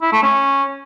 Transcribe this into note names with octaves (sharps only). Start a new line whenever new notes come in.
E4
A3
C#4